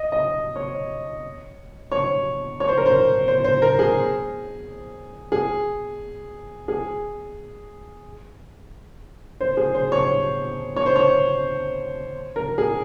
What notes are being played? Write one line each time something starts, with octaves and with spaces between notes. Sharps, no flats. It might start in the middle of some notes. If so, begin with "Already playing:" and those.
Already playing: D#5
D#5
C#5
C#5
C#5
C5
A#4
C5
C5
C5
A#4
G#4
G#4
G#4
C5
G#4
C5
C#5
C#5
C5
C#5
A#4
G#4